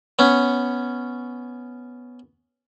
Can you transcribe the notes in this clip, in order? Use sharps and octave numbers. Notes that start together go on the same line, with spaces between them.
B3 C#4